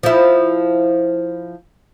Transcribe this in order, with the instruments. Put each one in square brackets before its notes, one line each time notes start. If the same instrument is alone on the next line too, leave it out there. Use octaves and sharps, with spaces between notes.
[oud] F3 E4